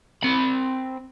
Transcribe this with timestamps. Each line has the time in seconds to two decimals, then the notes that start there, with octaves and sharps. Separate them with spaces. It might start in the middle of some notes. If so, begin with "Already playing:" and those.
0.23 C4 B5